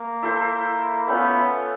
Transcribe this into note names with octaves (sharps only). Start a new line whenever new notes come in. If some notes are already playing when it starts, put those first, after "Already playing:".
Already playing: A#3
E4 A4 C5
A3 B3 C#4 F4